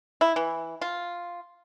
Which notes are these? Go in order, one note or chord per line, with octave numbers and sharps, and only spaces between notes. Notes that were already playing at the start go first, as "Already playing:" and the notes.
E4
E3
F4